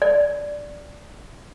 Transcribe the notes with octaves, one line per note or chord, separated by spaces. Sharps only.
D5